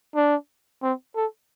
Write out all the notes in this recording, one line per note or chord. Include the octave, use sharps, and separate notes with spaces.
D4
C4
A4